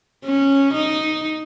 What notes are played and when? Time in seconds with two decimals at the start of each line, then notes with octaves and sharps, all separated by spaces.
0.25 C#4
0.74 D#4